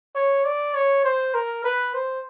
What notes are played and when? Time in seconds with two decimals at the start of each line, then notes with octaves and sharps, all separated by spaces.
0.15 C#5
0.45 D5
0.74 C#5
1.04 C5
1.34 A#4
1.64 B4
1.94 C5